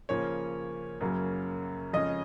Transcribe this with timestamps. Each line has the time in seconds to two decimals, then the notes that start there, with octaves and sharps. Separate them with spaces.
0.09 C#3 F3 A#3 C#4 C#5
1.01 F#2 C#3 F#3 A#3
1.93 F2 C#3 G#3 C#4 D#5